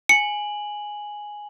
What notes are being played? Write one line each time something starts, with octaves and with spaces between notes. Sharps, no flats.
G#5 C#7 F#7